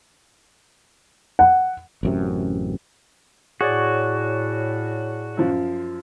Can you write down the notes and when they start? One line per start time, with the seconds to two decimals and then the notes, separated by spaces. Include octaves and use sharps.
1.39 F#5
2.03 A1 F#2 C3
3.61 A2 F#4 G#4 C#5 D5
5.37 F#2 F3